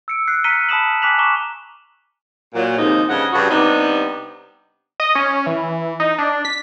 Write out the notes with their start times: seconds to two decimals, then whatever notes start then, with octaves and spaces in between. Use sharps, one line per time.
0.08 E6 C#7 D7
0.27 E6 F#6 C7
0.44 A#5 F6 B6 C#7 D#7 G7
0.69 A5 B5 D#6 B6 E7 F#7
1.02 G#5 D6 F#6 B6 F7 F#7
1.18 A#5 C#6 D6 E7 G7
2.54 A#2 F#3
2.77 D#2 C3 F3 G#3 A#3 D#4
3.09 G2 C#3 F3 D#5 F#5
3.33 G2 C#3 F#4
3.50 C3 G3 B3 D4 D#4
5.00 D#5
5.15 C#4
5.46 E3
6.00 D#4
6.18 D4
6.45 B6